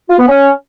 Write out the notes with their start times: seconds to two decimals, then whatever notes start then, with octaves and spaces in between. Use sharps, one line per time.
0.09 F4
0.18 B3
0.27 C#4